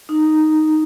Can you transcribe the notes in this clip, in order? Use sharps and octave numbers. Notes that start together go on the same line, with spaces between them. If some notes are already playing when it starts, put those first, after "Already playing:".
D#4